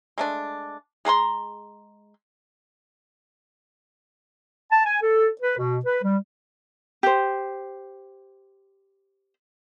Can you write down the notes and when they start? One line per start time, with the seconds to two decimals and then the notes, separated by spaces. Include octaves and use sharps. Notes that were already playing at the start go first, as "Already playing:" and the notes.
0.18 G#3 A3 D4
1.05 G#3 G#4 A#5 C6
4.71 A5
4.84 G#5
5.02 A4
5.41 B4
5.58 B2
5.85 B4
6.03 G3
7.03 G4 C5